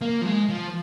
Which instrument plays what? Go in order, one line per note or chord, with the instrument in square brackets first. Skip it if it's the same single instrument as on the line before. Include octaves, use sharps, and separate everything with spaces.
[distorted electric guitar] A#3
F3
G#3
F3